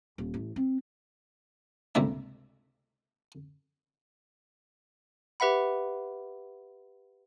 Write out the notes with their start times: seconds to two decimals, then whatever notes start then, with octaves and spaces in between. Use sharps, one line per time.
0.18 D#1
0.34 A1
0.56 C4
1.95 C#2 G2 C3 A3 A#3 E5
5.40 G4 B4 E5 F#5 B5